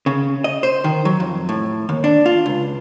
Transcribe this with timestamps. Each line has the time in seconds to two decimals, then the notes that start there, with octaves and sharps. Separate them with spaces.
0.06 C#3
0.44 D#5
0.63 C5
0.84 D#3
1.05 F#3
1.20 F2
1.49 A2
1.89 D#2
2.04 D4
2.26 F4
2.46 C#2